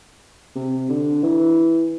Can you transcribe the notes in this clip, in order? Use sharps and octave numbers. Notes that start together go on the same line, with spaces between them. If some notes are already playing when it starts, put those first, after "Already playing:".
C3
D3
E3